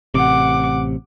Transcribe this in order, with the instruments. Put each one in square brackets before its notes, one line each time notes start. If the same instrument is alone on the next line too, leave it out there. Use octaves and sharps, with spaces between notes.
[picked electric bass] A1 C3 [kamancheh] F#5 D6